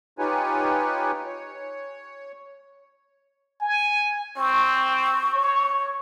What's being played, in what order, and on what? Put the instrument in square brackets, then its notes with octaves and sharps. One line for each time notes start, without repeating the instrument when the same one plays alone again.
[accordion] D#4 F4 G4 B4 C#5 G#5
C#5
[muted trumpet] G#5
[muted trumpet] C4 [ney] C#6
[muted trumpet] C#5